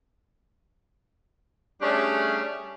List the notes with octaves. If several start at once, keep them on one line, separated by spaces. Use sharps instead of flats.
G3 A3 C#4 D4 G4 G#4